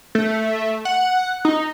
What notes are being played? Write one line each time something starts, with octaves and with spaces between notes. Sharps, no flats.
A3
F#5
D#4